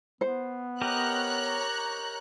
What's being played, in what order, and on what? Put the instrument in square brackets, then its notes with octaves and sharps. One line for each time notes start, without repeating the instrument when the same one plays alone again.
[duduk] B3 [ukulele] C5
[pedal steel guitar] G4 A#4 D#5 [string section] C#5 A#5 F#6